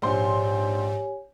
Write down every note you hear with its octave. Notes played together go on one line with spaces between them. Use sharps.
A#1 G#2 G4 C5 C#5 G#5 C6